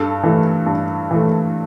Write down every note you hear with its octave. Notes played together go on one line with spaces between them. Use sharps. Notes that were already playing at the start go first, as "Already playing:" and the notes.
Already playing: G2 A4
E3 A3
G2
E3 A3